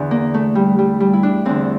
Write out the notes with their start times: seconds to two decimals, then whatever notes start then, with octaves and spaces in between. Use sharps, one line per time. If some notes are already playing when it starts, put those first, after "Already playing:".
Already playing: E2 D3
0.11 A#3
0.34 A3
0.55 G3
0.79 G3
1.00 G3
1.13 E4
1.23 D4
1.45 E2 D3 C4